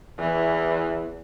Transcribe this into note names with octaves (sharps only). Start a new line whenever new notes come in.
E2 E3